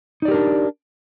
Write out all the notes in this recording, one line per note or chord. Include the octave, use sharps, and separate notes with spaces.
D4 D#4 G4 A#4 D5